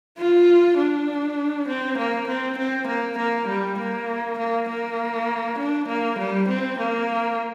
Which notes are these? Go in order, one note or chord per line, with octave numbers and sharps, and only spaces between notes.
F4
D4
C4
A#3
C4
C4
A#3
A#3
G3
A#3
A#3
A#3
D4
A#3
G3
C4
A#3